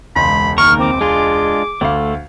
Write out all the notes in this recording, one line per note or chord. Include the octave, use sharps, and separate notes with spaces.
E1 C#2 B5 C6
D#3 A#3 A#4 C#6 F6
C4 D6
G#3 D4 F4 G#4
D2 A3 F5